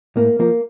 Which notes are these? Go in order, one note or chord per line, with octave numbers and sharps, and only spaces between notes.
A2 A#3
F3 A#3